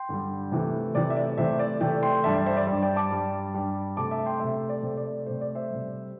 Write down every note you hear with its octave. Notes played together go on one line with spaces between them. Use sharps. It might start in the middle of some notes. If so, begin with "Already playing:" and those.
Already playing: G5 C6
G2 D3 G3
C3 E3 A3
C3 E3 A3 D5
E5
D5
C3 E3 A3 C5 E5
D5
C3 E3 A3 D5 G5
G5 C6
G2 G3 E5 A5
D5
C5 E5
D5
G2 G3 D5
D5 G5
A5 D6
G2 G3
G2 G3
C3 A3 A5 D6
E5 A5
G5 C6
C3 A3 E5 A5
D5
C3 A3 C5
D5
C3 A3 C5
D5
C5 E5
G3
C3